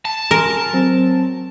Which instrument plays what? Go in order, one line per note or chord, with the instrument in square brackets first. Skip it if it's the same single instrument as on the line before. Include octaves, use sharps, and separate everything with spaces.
[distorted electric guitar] A5
[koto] A#4 [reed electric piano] G#5 C6
[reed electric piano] F#3 C4